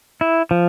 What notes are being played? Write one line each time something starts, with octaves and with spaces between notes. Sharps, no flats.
E4
F3